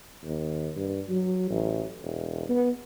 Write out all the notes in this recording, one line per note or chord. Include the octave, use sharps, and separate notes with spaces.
D#2
G2
F#3
A1
E1
B3